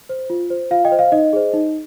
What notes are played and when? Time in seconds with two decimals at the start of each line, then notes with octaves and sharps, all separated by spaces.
0.09 C5
0.30 F4
0.50 C5
0.71 F4 F5
0.85 D#5 G5
0.92 C5
0.99 F5
1.12 D#4 D#5
1.33 G#4 C5
1.53 D#4